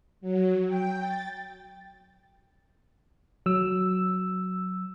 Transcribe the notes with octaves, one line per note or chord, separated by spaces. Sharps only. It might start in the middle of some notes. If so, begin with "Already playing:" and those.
F#3
G5
A6
F#3 E6